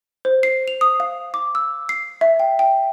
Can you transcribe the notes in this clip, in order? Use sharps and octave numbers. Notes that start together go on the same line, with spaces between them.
C5
C7
F7
D#6
F5
D6
E6
C7
E5
G5
G5